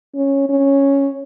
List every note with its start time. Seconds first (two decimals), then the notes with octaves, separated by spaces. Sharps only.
0.15 C#4
0.49 C#4